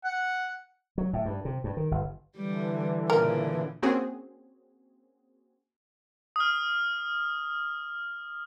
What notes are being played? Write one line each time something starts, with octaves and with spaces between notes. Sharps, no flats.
F#5
F#3
A2
G2
C3
G2
D#3
G1
D3 E3 G3
A#2 C#3 A#4
A#3 C4 C#4 F#4 G#4
D#6 F6